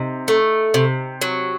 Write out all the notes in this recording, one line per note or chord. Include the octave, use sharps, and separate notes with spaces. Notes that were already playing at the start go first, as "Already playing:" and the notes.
Already playing: C3 D#4
A3
C3
F#3